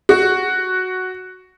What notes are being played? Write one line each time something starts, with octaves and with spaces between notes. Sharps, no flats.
F#4